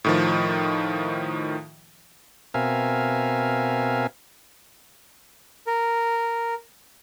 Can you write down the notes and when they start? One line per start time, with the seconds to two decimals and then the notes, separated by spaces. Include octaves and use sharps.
0.04 A2 D#3 F3
2.54 B2 C4 A#4 E5 F5 G#5
5.67 A#4